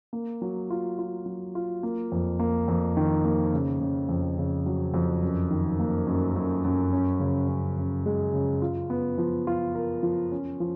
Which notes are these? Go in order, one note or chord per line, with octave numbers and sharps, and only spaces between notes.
A#3
F#3
F4
F4
F#3
F4
A#3
F2
A#3
F2
D#3
A#3
C#3
C#3
F2
C#3
F#3
F2
F#2
D#3
A#3
F#2
F#2
F#2
C#4
C#3
C#4
C#3
G#3
C#3
F4
B3
F3
F4
A#4
F3
C#4
F3